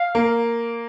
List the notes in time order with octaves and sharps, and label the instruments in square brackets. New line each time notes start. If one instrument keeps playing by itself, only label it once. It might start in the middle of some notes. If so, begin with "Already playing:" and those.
Already playing: [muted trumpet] F5
[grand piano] A#3